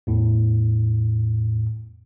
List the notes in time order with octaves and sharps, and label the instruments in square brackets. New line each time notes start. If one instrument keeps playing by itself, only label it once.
[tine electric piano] E2 A2